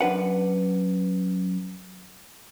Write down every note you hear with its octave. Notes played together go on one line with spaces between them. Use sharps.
F#2 D4 B4 F#5